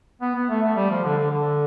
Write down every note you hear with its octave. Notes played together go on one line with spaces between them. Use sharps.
B3
B3
A3
A3
G3
F3
D3
D3
D3